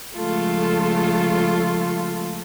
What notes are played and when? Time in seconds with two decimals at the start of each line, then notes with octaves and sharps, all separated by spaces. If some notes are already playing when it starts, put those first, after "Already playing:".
0.17 C#3 F3 G#3 A3 F4 A4